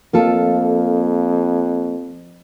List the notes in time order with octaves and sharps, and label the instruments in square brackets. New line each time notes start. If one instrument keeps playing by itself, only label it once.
[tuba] F2 [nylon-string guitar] A#3 F4 A4